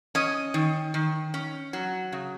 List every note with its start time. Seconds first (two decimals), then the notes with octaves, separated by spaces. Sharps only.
0.15 C#4 D#5
0.54 D#3
0.94 D#3
1.34 C#4
1.73 F#3
2.12 C#3